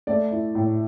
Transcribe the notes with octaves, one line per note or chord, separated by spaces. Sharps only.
A3 D5
E4
A2